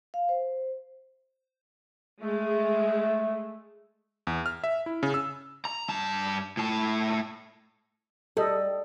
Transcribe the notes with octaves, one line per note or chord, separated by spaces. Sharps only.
F5
C5
G#3 A3
E2
F6
E5
E4
C#3
E6
A#5
G2 A5
A2 A5
G3 A4 D#5